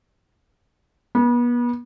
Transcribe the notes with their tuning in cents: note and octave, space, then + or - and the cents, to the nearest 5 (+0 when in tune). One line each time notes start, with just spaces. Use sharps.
B3 -35